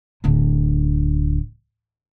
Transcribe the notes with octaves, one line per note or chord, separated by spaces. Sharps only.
D1 D3